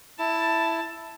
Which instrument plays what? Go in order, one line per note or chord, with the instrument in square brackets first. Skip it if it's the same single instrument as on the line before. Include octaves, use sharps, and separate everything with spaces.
[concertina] E4 [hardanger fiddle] A5